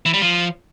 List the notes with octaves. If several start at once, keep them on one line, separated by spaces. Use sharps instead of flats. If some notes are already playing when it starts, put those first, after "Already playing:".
E3
G3
F3